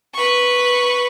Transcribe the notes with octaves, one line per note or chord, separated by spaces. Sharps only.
B4 C#6